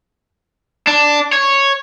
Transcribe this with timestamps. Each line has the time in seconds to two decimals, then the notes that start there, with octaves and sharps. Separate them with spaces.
0.87 D4
1.33 C#5